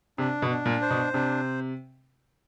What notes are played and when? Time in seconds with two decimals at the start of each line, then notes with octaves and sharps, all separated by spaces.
0.18 C3 D4
0.42 B2
0.50 D4
0.66 A#2
0.81 C5
0.90 B2
1.13 C3 D4